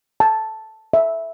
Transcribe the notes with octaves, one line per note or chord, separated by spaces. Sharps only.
A5
E5